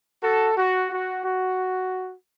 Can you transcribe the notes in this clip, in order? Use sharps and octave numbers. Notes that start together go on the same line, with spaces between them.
F#4 A4
F#4
F#4
F#4